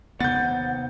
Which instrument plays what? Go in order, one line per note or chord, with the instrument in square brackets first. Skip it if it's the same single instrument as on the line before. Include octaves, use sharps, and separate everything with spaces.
[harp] D#2 C3 D#3 [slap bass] B3 [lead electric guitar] F#5 [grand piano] G6 A6